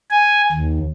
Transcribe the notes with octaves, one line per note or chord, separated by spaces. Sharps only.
G#5
D#2